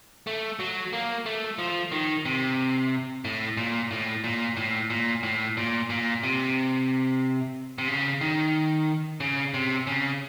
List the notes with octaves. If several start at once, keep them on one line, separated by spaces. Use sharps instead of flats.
A3
F#3
A#3
A3
F3
D#3
C3
A2
A#2
A2
A#2
A2
A#2
A2
A#2
A#2
C3
C3
C#3
D#3
C#3
C3
C#3